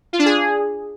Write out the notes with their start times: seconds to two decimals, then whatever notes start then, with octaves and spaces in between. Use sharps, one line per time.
0.13 F4
0.19 D4
0.26 G#4